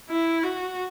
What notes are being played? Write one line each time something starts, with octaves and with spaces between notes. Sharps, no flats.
E4
F#4